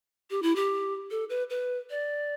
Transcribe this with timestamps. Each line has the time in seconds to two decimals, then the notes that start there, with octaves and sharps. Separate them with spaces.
0.30 G4
0.43 E4
0.56 G4
1.11 A4
1.30 B4
1.50 B4
1.90 D5